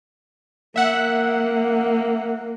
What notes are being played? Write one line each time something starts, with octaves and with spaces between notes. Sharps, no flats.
A#3 E5 F#5